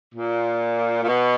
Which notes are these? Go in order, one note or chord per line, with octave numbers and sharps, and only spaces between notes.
A#2
A#2
B2